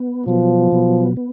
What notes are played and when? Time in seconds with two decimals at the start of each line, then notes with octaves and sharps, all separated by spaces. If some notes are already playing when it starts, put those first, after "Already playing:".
Already playing: B3
0.26 B2 F3 F#3 B3
0.72 B2 F#3 B3
1.17 B3